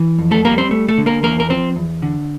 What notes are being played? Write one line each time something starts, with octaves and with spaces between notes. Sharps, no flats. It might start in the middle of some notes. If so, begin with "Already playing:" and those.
Already playing: E3
F2
A3 A4
G3 A#3 A#4
C4 C5
A3
A3 A4
D3
A#3 A#4
E2 A#3 A#4
A#4
F3 C4 C5
E2
D3